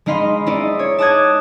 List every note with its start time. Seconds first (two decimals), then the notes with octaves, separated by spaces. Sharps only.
0.06 G#3 D#4 D#5 F5 B5 C6
0.46 D#4 E4 D5 D#5
0.79 C#5
0.98 A5 D6 D#6 F#6 G#6